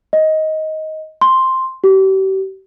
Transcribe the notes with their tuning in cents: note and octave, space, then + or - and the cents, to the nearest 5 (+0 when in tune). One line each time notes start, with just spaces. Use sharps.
D#5 +15
C6 +5
G4 -40